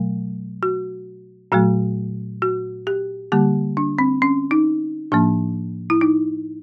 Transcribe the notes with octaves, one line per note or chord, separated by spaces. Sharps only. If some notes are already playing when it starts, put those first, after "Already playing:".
Already playing: B2 F#3 A3
F#4
A#2 F#3 A3 F#4
F#4
G4
D3 G3 A#3 G4
D4
C4
C#4
D#4
A2 F3 A#3 D4
E4
D#4